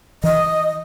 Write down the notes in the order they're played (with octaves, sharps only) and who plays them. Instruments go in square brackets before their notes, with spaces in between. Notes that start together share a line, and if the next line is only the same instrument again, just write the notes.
[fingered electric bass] E3 [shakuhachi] D#5